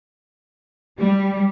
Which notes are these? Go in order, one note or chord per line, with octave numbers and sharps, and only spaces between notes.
G3